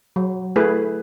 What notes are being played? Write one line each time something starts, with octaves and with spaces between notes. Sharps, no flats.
F#3
A3 E4 G#4 B4